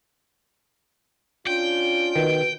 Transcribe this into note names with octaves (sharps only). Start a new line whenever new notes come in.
C#4 D4 F4 G5
B2 D#3